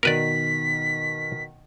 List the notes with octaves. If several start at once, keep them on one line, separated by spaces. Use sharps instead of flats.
B2 D#3 A#4 B4 D5 B6